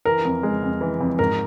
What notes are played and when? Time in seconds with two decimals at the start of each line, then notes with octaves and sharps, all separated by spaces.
0.05 E3 A#4
0.25 F2
0.43 G#3
0.63 F2
0.81 E3
1.01 F2
1.19 G#2 A#4